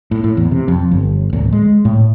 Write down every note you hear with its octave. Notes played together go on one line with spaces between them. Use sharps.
A2
A2
E2
C3
F2
G1
D1
G#3
A2